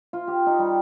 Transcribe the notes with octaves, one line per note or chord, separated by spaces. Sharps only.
F4
G4
D#4
G3